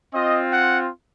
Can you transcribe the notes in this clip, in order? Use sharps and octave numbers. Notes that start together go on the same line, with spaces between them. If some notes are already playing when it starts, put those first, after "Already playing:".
C4 F4 D#5
F#5